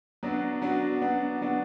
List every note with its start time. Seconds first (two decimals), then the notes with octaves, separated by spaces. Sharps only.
0.23 F#3 B3 D4 F#4
0.62 F#3 B3 D4 F#4
1.02 F#3 B3 D4 F#4
1.41 F#3 B3 D4 F#4